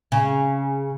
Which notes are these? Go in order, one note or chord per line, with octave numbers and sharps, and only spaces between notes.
C#3